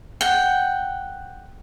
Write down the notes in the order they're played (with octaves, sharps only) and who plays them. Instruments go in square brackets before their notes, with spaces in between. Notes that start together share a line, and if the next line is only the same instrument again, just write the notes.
[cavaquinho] F#5 G5